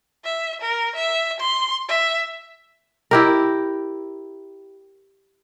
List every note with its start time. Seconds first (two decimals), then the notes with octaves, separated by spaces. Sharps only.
0.25 E5
0.61 A#4
0.95 E5
1.40 C6
1.89 E5
3.11 E4 G4 A#4